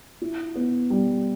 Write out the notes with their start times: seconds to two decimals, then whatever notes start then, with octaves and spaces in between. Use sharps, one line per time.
0.22 E4
0.56 B3
0.90 G3